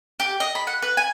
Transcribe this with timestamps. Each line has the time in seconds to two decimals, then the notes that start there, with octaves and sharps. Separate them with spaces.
0.20 G4
0.40 D#5
0.55 B5
0.67 F#5
0.82 B4
0.97 G#5